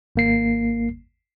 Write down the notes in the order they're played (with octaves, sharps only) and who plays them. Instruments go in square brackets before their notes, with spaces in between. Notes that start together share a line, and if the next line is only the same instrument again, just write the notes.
[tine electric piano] G#1 A#3 C7